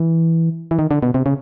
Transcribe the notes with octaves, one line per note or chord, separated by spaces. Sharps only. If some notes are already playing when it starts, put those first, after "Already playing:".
Already playing: E3
E3
D#3
D3
B2
C3
C#3